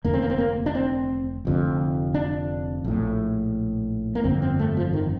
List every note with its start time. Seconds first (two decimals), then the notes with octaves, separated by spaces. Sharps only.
0.04 F1 D#2 D3 A#3
0.14 C4
0.22 A#3
0.30 C4
0.38 A#3
0.66 D4
0.75 C4
1.45 F1 F2 D3
2.14 D4
2.84 A#1 A2
4.15 A#3
4.24 G1 F2 D3 C4
4.42 C4
4.59 A3
4.77 F3
4.93 D#3